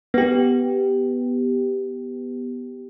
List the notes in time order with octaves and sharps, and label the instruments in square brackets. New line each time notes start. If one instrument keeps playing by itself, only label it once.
[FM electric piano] B3 G4